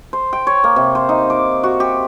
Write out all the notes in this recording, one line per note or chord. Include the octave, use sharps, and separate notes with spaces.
C5
G5
C#5
A#3
C3
C5
D#4
D6
F#4
G4